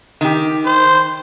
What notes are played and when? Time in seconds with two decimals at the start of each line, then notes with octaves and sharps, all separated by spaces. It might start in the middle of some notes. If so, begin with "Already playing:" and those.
0.21 D#3 G4
0.65 C5